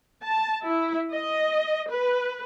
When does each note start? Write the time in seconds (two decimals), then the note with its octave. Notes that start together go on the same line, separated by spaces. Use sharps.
0.22 A5
0.67 E4
1.12 D#5
1.90 B4